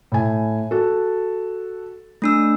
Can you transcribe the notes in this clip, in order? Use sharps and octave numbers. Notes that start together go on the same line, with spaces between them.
A2 G#5
F#4 A4
A3 D4 E6